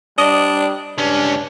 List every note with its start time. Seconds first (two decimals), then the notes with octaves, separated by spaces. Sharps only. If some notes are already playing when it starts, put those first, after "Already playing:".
0.18 G3 D4 D#5
0.98 C#2 G2 C#4 D4